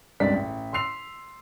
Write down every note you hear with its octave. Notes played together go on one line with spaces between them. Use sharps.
C#2 G2 C3 D5 B6
A1
C6 E6 C7 F7